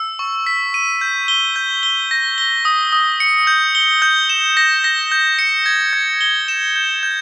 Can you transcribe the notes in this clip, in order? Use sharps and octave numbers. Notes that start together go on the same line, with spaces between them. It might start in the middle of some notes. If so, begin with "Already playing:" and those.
Already playing: E6
C#6
B6
D#7
G6
G7
G6
G7
A#6
G7
D#6
D#6
C#7
G6
G7
G6
E7
A#6
A#6
G6
C#7
G#6
G#6
G7
E7
G6
G6